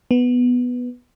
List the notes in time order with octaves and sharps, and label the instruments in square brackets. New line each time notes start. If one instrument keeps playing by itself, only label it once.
[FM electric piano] B3